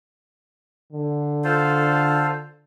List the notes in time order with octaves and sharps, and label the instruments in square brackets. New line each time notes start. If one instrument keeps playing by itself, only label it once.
[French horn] D3
[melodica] F4 A4 C5